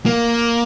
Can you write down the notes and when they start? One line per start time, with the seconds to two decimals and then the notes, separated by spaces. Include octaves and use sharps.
0.06 A#3